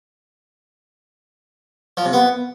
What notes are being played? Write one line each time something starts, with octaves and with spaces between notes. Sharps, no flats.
F3
C3
B3